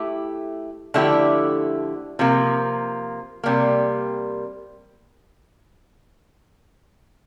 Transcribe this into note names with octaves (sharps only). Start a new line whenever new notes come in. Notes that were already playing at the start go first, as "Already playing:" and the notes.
Already playing: A3 E4 G4
D3 F3 A3 E4 G4
C3 F3 A#3
C3 G3 A#3